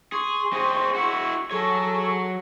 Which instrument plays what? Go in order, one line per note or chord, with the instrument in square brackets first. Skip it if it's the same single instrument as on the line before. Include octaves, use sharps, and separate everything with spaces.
[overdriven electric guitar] G#4 [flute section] C6 C#6
[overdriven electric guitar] C4 G#4
E4 F#4
[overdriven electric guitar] F#3 C#5 [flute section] G#4 A4 C#6